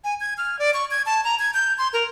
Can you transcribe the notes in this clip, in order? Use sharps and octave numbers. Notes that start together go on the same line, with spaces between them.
G#5
G#6
F6
D5
C#6
G#6
A5
A#5
G#6
G6
C6
A#4